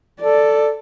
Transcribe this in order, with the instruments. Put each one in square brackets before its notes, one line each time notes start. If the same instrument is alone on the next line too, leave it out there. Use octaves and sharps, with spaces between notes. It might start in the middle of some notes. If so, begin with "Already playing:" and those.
[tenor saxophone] A4 [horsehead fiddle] D5